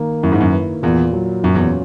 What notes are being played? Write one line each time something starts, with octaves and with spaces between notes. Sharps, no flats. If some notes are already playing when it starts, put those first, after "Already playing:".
Already playing: D#3 A#3
F#2 E4
G#2
F#2
B4
E2 A#2
F#3
F#2 C#4
E2